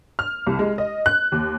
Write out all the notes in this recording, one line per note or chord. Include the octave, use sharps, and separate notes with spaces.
F6
C2
G#3
D#5
F#6
D#2